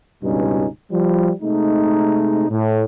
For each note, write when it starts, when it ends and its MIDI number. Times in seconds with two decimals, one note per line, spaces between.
0.23 0.67 37
0.23 0.67 43
0.23 0.67 47
0.23 0.67 55
0.23 0.67 61
0.23 0.67 63
0.91 1.31 53
0.91 1.31 55
1.42 2.46 48
1.42 2.46 56
1.42 2.46 57
1.42 2.46 63
2.50 2.84 45